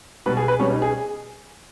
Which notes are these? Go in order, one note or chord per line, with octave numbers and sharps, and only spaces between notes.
B2 G3 B4
G#4
B4
B2 G3 C#4
D#4
G#4